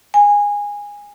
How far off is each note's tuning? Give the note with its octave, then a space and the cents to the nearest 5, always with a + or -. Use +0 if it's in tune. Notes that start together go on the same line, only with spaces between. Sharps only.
G#5 -15